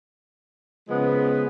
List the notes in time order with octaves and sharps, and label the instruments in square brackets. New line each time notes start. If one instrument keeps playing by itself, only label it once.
[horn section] C#3 F3 G#3 B3